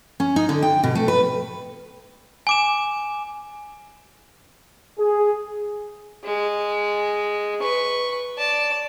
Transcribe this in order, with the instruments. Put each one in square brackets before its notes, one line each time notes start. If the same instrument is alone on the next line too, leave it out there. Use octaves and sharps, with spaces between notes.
[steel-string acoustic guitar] C#4
D#4
D3
G5
B2
A3
B4
[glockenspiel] G#5 D6 E7
[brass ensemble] G#4
[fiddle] G#3
B4 C#6
D5 A5